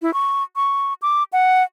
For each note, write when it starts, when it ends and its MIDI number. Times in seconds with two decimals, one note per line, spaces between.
0.02 0.13 64
0.14 0.43 85
0.56 0.94 85
1.02 1.23 86
1.33 1.63 78